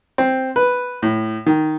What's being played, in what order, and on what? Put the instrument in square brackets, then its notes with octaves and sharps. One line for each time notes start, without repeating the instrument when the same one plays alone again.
[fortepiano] C4
B4
A2
D#3